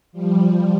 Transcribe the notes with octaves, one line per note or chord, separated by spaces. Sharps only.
F3 G3